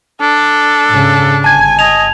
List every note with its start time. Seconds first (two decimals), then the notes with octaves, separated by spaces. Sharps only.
0.21 D4 A4
0.88 G#2 C#3
1.44 G1 G#5 A5 G#6
1.79 D#5 F7